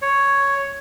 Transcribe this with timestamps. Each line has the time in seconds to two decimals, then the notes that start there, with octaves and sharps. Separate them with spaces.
0.02 C#5